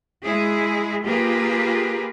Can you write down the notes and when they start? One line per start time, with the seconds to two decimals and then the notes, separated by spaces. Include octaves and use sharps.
0.23 G#3 E4 G#4
1.05 A#3 F4 G4 G#4 A#4 B4